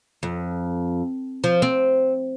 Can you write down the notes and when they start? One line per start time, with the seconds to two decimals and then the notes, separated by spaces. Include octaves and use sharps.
0.23 F2
1.44 F3
1.62 C4